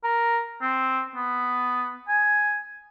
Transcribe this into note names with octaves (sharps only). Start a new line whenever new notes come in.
A#4
C4
B3
G#5